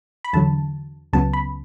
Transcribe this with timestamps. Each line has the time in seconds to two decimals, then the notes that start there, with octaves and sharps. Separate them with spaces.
0.24 B5
0.33 E2 D3 F#3 A5
1.13 C#2 C#3 F#3 B3 A5
1.33 B5